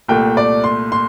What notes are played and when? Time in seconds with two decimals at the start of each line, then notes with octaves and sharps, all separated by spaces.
0.08 C2 A#2 A3 G5
0.37 D5
0.64 C6
0.92 C6